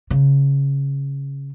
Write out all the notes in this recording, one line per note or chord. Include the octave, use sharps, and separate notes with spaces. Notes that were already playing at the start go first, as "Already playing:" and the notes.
C#3